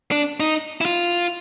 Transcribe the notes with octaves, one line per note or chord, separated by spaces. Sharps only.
D4
D#4
E4
F4